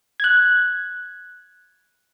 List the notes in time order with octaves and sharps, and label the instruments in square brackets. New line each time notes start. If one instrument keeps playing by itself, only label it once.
[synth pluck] F#6 G#6